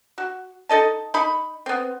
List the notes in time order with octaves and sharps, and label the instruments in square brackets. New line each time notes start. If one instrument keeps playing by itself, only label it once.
[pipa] F#4
D#4 A4 D#5 A5
D#4 B5
B3 C4